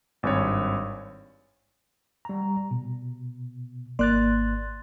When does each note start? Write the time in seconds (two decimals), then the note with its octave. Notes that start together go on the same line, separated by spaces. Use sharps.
0.23 G#1 G2 C#5
2.25 G3 A#5
2.71 B2
3.99 G#1 A#3 D5 C6 F#6 A6